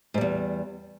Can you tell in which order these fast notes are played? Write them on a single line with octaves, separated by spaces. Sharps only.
G#2 G3 E2